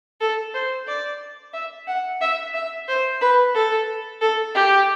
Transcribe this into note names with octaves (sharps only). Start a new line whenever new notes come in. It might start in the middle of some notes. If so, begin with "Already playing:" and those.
A4
C5
D5
E5
F#5
E5
E5
C5
B4
A4
A4
G4